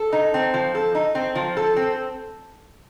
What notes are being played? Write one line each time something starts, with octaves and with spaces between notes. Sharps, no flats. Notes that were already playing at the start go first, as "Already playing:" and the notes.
Already playing: A4
D#4
C4
F3
A4
D#4
C4
F3
A4
C4